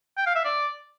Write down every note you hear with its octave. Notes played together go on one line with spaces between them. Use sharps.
G5
F5
E5
D5